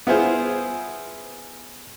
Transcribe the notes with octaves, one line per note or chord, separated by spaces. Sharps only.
B3 E4 F4 G#4 C5